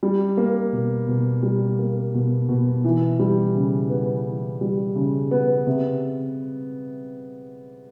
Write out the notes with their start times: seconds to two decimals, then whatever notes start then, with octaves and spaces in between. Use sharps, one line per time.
0.03 G3
0.37 A#3
0.73 B2
1.08 B2
1.43 G3
1.79 A#3
2.14 B2
2.49 B2
2.84 E3
3.19 G3
3.55 C#3
3.90 B3
4.26 E3
4.61 G3
4.96 C#3
5.31 B3
5.67 C3